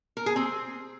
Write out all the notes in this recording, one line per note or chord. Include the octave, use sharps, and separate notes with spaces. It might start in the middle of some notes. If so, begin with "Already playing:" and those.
A#4
G#4
C4